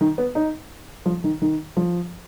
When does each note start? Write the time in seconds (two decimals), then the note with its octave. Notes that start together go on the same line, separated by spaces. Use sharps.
0.01 D#3
0.18 B3
0.35 D#4
1.06 F3
1.24 D#3
1.42 D#3
1.77 F3